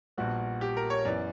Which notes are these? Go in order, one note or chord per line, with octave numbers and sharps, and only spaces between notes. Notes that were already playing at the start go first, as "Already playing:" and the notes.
A#1 A#2 G3 B3 F#4
G4
A#4
C#5
F#2 E3 B3 D5